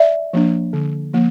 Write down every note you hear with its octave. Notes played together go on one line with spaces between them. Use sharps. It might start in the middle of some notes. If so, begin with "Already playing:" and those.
Already playing: D5 E5
F3 A#3 D4
D3
F3 A#3